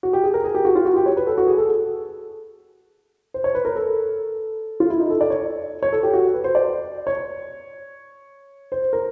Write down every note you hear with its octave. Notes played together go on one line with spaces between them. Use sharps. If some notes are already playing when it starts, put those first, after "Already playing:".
F#4
G4
G#4
A#4
G#4
G4
F#4
F4
F#4
G4
C#5
B4
A4
F#4
G#4
A4
C5
C#5
B4
A#4
A4
F4
E4
D#4
A4
D5
C#5
C#5
A4
G4
F#4
B4
C5
D5
C#5
C5
A#4